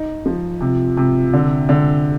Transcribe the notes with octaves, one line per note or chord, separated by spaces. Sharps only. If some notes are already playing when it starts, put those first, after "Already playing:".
Already playing: D#4
F3
C3
C3
D3
D3